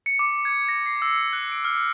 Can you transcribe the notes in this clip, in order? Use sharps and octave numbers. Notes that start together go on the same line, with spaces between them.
C#7
D6
G#6
A#6
C7
E6
F#6
D7
F6